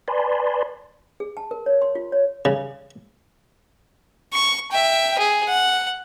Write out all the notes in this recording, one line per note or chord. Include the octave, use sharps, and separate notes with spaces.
B4 D5 G#5 A5 B5 C6
G#4
A5
A#4
C#5
C6
F4
C#5
C#3
C#6
E5 G5
G#4
F#5